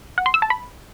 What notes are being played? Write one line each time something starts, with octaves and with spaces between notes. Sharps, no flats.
F#5
C6
E6
A5
B5